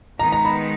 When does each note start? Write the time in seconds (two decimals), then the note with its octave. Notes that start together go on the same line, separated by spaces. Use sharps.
0.19 D#3 G#3 B3 D#4 A#5
0.32 A#5
0.45 B5